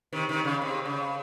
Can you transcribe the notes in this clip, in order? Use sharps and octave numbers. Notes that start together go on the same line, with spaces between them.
C3 D#3
C3 D#3
C#3
C3
C#3